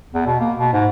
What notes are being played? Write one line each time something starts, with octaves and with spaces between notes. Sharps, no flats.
E2
B2
A#3
B2
G#2